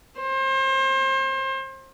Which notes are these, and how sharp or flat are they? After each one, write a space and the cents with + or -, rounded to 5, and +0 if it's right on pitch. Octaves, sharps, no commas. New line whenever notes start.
C5 +35